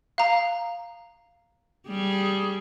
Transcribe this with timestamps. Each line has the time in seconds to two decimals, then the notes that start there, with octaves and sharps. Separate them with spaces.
0.18 F5 A#5
1.87 G3 G#4